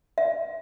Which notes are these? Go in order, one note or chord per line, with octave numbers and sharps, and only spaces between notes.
E5